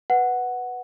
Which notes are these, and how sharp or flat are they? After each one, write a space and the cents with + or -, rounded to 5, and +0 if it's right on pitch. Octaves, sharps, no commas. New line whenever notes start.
B4 +0 F#5 +0